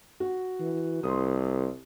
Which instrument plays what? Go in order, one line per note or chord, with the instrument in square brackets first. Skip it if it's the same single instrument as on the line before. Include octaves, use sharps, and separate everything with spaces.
[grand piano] F#4
[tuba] E3
[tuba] C2 [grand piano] C6 D#6